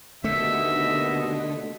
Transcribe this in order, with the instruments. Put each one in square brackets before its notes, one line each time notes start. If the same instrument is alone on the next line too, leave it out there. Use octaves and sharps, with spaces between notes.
[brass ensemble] D#2 B2 D#5 [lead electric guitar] D3 [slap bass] A3 [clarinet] E5